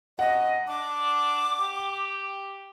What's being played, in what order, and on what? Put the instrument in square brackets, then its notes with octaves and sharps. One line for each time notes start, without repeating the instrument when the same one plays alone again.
[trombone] F#2 [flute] D#5 [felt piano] F#5
[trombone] D4 [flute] D6
[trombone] G4